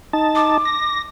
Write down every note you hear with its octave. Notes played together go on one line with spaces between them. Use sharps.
D#4 A5
D6
A#6